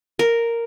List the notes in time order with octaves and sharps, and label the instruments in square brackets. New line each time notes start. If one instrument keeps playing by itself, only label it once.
[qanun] A#4